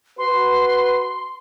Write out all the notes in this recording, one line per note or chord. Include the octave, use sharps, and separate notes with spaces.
F#4 B4 C6